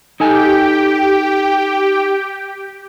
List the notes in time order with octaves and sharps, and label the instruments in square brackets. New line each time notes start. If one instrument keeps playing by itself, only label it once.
[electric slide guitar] D#4 A4 G#5 [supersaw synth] G4 G5